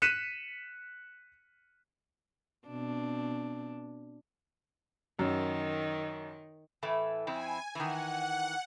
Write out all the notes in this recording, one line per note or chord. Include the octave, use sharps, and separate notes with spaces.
F#6 B6 C#7 D#7 E7
B2 C4 D4
F#2 D#3
A2 E3 A3
F2 C4 E4 G#5
D#3 E3 F#5